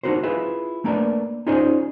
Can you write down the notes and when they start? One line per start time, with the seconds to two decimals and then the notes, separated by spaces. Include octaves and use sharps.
0.03 D4 D#4 F#4 A#4 C5
0.23 E4 F4 G#4 B4 E5
0.84 A3 A#3 D4 A#4 B4 D5
1.47 C#4 D#4 F4 G#4 C5 D5